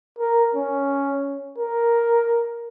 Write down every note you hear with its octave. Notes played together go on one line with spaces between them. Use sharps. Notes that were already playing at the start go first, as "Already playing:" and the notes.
A#4
C#4
A#4